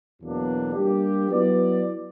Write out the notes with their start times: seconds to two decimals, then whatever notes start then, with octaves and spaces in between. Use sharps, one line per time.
0.19 E2 B2 F#3 A#3 D4
0.73 G3 A#3 D4 G4
1.28 F#3 B3 E4 B4 D5